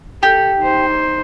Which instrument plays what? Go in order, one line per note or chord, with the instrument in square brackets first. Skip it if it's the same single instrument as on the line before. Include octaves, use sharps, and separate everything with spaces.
[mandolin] G4 [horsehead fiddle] A4
[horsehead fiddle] D#4 C5